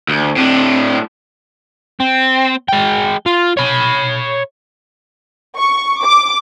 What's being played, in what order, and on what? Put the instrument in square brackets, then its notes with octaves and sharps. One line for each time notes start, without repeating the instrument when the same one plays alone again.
[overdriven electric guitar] D2
[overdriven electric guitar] A2 D4 [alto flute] C4
[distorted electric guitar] C4
G#3 G5
F4
C#5 B5
[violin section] C#6
D6